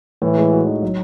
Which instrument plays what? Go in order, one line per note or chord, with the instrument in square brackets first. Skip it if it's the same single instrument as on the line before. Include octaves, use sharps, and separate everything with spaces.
[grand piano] A2 [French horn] E3
[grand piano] G#3
F#4
D#4
F#3